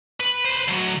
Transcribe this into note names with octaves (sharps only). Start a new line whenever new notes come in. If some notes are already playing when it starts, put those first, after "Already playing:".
B4
B4 C5
D2 F#3